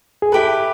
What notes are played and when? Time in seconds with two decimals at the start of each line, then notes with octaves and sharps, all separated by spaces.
0.22 G#4
0.32 E4 G4 A4 B4